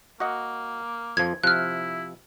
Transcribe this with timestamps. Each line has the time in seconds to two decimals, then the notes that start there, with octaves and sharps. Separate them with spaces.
0.20 A#3 F#4 D#5 F#5
1.17 F2 F3 G#6
1.43 C3 F3 E4 F6 F#6